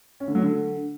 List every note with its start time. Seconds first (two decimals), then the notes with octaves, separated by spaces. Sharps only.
0.20 C#4
0.28 D3
0.35 F#3
0.42 D3